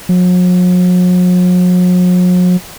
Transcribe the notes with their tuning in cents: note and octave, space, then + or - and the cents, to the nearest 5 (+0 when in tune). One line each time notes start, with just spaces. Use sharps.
F#3 -45